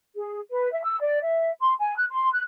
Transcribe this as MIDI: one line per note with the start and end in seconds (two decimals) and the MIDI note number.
0.15 0.39 68
0.51 0.71 71
0.72 0.81 76
0.83 0.98 88
1.00 1.19 74
1.23 1.51 76
1.59 1.73 84
1.79 1.96 80
1.97 2.06 90
2.11 2.30 84
2.32 2.41 90